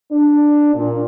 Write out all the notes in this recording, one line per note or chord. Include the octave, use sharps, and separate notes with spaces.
D4
A#2